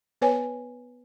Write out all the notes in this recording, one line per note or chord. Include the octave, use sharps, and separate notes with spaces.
B3 B4 C#5 G#5